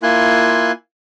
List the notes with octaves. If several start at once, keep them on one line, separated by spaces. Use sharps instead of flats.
A#3 E4 F4 G#5 C6 F#6